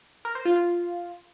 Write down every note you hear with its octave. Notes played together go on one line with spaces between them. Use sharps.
A#4
C5
F4
F4